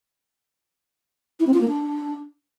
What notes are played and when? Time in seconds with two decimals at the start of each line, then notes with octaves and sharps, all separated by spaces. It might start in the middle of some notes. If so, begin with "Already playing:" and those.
1.40 E4
1.47 C4
1.54 F4
1.61 A#3
1.68 D4